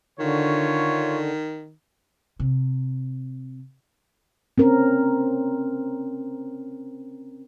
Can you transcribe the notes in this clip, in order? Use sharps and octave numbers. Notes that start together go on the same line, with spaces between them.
D3 D#3 F4 C#5 C#6
C3
C4 C#4 A#4